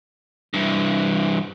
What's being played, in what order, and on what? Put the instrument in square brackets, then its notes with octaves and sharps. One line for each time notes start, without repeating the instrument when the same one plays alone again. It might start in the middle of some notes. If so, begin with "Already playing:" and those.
[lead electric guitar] G2 E3